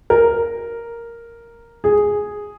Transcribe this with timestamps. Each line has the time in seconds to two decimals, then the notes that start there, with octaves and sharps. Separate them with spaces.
0.10 A#4
1.84 G#4